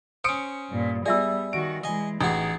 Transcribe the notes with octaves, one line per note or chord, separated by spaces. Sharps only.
C#4 C5 D#6 C#7 D7
G2 A#2
G3 B3 G#4 D5 E5 E6
D#3 F#4 D7
E3 G#3 D#5 G#5
A1 D#4 F#4 G#4